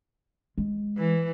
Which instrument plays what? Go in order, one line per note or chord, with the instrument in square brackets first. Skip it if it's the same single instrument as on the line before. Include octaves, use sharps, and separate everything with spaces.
[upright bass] G#3
[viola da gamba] E3